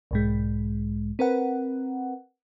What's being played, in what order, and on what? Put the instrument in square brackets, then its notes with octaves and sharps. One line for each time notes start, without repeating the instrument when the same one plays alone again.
[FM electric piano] B1 G#2 G#3
C4 A#4 B4 F#5